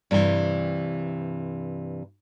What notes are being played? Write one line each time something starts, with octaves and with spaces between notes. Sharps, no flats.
G2 C3 D#3 E3